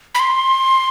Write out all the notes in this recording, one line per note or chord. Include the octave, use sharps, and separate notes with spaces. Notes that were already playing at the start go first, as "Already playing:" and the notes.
B5
C6